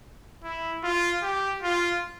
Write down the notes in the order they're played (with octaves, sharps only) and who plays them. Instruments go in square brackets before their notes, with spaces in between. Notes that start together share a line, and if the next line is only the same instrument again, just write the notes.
[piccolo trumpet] E4
F4
G4
F4